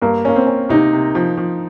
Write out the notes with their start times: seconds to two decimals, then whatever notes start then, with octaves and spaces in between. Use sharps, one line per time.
0.02 G2 A#3
0.25 A#3 C#4
0.36 C4
0.47 C#4
0.69 C3 D#4
0.93 C3
1.15 F3
1.37 F3